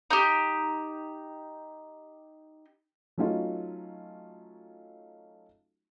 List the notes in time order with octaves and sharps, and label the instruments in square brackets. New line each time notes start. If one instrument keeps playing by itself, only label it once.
[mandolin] D#4 G4
[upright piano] F#3 A3 C#4 D#4 F4